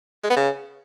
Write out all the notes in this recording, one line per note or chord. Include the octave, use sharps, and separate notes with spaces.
G#3
B3
C#3